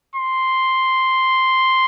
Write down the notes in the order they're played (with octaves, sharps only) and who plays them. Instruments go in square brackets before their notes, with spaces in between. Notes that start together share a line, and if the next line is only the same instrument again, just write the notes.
[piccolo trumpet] C6